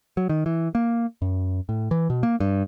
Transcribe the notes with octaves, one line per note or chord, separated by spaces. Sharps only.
F#3
D#3
E3
A#3
F#2
A2
E3
B2
A#3
G2